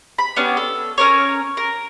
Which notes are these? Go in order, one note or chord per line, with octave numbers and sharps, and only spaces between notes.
B5
B3 C#4 D4 G4
A4
C#4 A#4 C#5
A#4